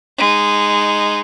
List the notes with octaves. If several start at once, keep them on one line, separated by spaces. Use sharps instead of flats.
G#3 D#4